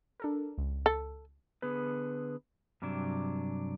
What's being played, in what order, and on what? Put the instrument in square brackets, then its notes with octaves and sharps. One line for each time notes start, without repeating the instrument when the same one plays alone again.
[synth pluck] D4 A4 A#4
C#2
[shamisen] A4
[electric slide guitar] D3 B3 G#4 B4
G2 C3 F#3 D4